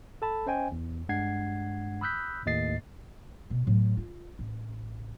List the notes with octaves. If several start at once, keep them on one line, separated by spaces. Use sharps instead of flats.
A4 A5 B5
C#4 C5 D#5 G5 G#5
E2
G2 G#3 D4 F#5 G#6 C7
B5 D#6 E6 F#6 G6 B6
D#2 A2 A3 D#5 A6 C7
B2
A2 F#3
F4
A1